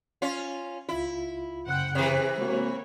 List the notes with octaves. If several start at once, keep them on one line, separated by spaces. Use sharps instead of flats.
C#4 F4
C#2 E4 F4
F#2 C#3 C5 F#5 G5 F#6
C3 E3 G#4 B4
G#3 A#3 F#4 C#5